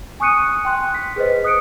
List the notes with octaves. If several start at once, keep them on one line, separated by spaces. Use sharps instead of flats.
G#5 C#6 D#6 F#6 C#7 D#7
G5 C6 F#6
B6
G#4 B4 C5 D#5
D#6 F#6 C#7 D7